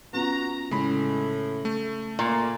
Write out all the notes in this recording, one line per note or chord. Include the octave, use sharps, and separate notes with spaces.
B3 C#4 F4 F#4 A#5
A2 C#3 G#3 B5
A3
A#2 A#3